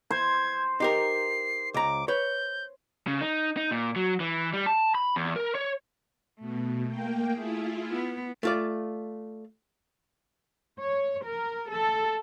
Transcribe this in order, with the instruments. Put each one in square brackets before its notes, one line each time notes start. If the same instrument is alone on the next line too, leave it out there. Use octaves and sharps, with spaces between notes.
[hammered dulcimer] C5 [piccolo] G#6
[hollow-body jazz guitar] D#4 G4 A#4 [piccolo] C7
[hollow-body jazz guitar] C#2 A#5 [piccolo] D6
[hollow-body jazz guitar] B4 C#5 [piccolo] G6
[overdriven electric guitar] C#3
D#4
D#4
A#2
F#3
E3
G3
A5
B5
E2
A#4
C#5
[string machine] B2 [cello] A3
[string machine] A#3 G5
[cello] A3 G#4 [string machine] E4 F4
[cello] B3
[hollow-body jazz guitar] A3 F4 D5
[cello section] C#5
A#4
A4